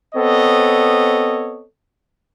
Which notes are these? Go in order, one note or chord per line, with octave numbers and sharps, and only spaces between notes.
B3 C4 A4 C#5 D#5